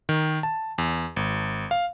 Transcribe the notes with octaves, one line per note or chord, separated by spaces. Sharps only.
D#3
A5
E2
G#1
F5